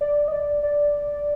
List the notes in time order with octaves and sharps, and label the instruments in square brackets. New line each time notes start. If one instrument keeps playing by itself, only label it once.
[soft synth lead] D5
D#5
D5
D5